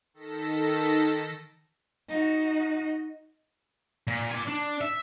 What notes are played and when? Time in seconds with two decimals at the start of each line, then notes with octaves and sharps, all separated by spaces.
0.14 D#3 A4 A#6 B6
2.08 D#4 F#4
4.07 A#2
4.31 D5 G#5
4.47 D4
4.81 E5